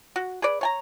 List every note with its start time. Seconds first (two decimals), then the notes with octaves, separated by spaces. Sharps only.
0.16 F#4
0.42 G#4 B4 D5
0.61 C#5 G#5 A#5